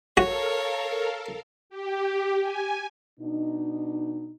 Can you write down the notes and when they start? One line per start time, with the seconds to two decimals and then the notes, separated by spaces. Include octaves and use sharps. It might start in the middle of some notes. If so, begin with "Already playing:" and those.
0.17 F#4 A4 A#4 C#5 F5
1.70 G4
2.42 G#5
3.20 B2 D4 D#4